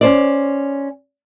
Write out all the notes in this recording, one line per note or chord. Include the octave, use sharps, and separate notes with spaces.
C#4 C5 D5